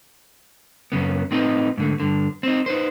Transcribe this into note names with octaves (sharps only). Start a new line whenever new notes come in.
F#2 C#3 B3
A2 C4 D#4 B4 D#5
G#2 D3 A3
G2 D3
C4 D#4
D#4 B4 C5